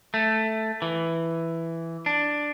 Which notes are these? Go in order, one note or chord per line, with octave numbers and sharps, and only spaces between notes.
A3
E3
D4